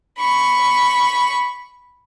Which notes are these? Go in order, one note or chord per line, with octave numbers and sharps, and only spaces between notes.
B5 C#6